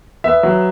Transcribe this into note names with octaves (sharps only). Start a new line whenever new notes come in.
B3 E5
F#3